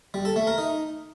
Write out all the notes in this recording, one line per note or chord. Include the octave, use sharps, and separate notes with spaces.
G3
A4
A3
A#4
D#4